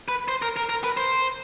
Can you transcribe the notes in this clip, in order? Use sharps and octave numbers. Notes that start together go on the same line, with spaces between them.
B4
C5
A#4
A#4
A#4
B4
C5